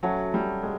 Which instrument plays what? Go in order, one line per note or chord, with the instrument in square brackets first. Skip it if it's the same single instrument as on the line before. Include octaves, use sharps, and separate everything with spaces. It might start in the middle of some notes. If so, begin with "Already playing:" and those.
[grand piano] F#3 [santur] A3 C#4 F#4
[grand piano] G3
G#3